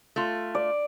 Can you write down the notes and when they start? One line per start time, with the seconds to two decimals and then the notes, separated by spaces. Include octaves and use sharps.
0.16 A3 F4
0.55 D5